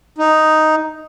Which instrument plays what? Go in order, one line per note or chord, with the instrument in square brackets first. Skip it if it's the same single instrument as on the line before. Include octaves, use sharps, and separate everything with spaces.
[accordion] D#4